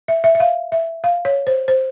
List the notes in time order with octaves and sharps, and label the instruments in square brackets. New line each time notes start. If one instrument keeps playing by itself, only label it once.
[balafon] E5
E5
E5
F5
E5
F5
C#5
C5
C5